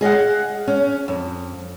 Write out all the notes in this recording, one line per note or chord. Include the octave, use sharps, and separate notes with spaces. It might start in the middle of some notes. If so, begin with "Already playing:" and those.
G#4 D#5 F5 F#5
C#4
F2